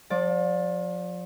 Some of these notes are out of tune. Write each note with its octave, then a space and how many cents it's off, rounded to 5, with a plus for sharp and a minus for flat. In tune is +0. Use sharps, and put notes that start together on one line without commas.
F3 +35 D5 +0